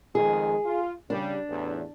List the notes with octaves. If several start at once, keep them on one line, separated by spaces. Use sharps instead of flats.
F2 D#3 G#3 G#4
F4
C#3 G3 D4
A1 E2